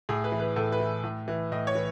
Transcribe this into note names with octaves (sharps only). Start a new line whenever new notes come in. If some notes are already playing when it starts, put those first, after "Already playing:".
A2 G#4
B4
E3
B4
A2 A4
B4
E3
A2
E3
A2 D#5
C#5
E3